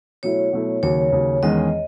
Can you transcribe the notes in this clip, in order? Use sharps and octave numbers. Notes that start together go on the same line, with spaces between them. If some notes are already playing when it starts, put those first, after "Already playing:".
B2 F#3 A3 E4 C#5
B2 F#3 A3 E4
D#2 C#3 F#3 C#5
D#2 C#3 F#3
E2 D#3 G#3 C#4 G#4 D#5